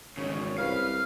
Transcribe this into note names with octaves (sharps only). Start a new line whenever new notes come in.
G#1 E2 C#3 C#5
C2 B4 F5 F6